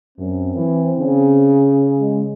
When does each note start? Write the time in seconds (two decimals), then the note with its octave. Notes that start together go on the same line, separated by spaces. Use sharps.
0.18 F#2 C4
0.55 E3
0.98 C#3
1.99 G#3